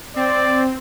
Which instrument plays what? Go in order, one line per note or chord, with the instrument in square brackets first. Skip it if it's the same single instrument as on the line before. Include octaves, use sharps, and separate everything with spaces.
[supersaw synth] C4 [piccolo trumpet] D5